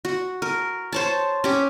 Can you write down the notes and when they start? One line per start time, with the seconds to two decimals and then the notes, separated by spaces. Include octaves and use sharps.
0.05 F#4
0.42 A#4
0.92 C5 C#5 A5
1.44 C#4 G4